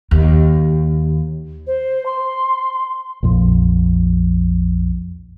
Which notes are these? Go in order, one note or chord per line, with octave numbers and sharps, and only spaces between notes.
D#2
C5
C6
A#1 F2